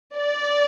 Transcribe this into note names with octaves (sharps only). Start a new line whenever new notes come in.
D5